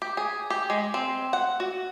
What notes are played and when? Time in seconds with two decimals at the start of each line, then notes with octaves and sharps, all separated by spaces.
0.02 G4
0.17 G#4
0.50 G4
0.70 G#3
0.94 C4
1.33 F#5
1.60 F#4